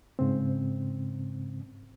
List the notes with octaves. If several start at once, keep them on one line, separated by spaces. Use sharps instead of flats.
G#2 C#3 C4